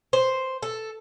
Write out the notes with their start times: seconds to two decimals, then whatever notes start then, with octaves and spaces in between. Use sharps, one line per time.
0.13 C5
0.63 A4